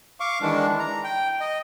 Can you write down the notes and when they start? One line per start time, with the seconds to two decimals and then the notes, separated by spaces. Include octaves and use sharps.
0.20 F5 C#6 D6
0.41 D#3 E3 G#3 D4
0.79 A#5
1.04 G5
1.41 D#5